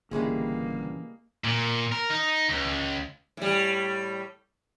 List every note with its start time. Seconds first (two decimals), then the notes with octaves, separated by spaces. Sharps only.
0.11 G1 A#2 C#3 E3 G3 G#3 A#3 G#4
1.44 A#2
1.92 A#4
2.10 D#4
2.49 C#2
3.37 A2 G3